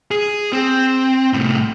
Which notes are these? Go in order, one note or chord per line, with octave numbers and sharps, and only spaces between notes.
G#4
C4
C2 A2